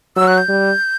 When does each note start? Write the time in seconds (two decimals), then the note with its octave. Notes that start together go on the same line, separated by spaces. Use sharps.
0.16 F#3 E6
0.27 F#6
0.38 G6
0.48 G3